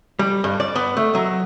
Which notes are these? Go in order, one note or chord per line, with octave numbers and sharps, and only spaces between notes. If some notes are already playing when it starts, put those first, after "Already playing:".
G3
G2
D5
B3
A3
F#3